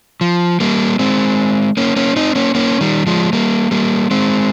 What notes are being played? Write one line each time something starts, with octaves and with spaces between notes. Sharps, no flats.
F3
G3 A#3
G#3 C4
A#3 C#4
A#3 C#4
C4 D#4
A#3 C#4
A#3 C#4
D#3 G3
F3 G#3
G3 A#3
G3 A#3
G#3 C4